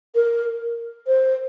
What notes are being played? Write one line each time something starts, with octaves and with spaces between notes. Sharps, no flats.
A#4
C5